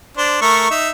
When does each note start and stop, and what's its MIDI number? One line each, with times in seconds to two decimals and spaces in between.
0.17 0.39 62
0.17 0.39 72
0.42 0.70 57
0.42 0.70 70
0.42 0.70 85
0.70 0.90 63
0.70 0.90 76